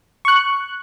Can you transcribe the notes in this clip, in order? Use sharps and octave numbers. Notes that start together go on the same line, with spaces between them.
C#6 F#6